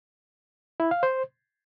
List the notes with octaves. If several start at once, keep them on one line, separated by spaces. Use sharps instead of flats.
E4
F5
C5